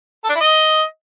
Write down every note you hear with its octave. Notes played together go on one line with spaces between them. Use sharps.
A4
D4
E4
D#5